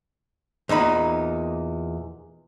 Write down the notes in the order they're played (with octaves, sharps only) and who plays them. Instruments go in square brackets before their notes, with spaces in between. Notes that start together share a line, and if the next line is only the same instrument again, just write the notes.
[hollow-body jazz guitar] E2 A#2 D#4 B5